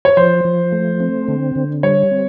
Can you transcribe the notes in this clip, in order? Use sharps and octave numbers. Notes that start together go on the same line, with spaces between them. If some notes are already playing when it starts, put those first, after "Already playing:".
C#5
F3 C5
F3
A3
C4
D3
D3
G3 C#5
C4